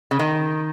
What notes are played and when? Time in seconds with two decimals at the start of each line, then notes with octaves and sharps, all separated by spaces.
0.11 C#3
0.19 D#3